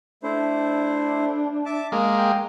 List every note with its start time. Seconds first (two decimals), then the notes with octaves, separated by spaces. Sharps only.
0.23 A3 D4 E4 C5
1.66 E5 A5 D6
1.92 G#3 A#3 A#5
2.18 G5